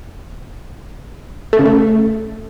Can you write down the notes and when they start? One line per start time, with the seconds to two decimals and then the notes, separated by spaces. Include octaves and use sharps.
1.53 A3
1.59 C#3
1.65 A3